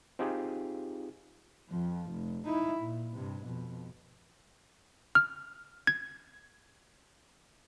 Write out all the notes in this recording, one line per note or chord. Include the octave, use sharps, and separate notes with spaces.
C4 D#4 F4 G4 G#4
F2 F3
F1
D#4 E4
A#2
G2 C3
F2 B2
F6
G#6